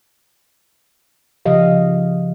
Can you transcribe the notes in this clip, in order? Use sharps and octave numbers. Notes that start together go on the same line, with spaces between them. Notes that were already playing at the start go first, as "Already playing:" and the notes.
C#3 F3 G4 D#5 F5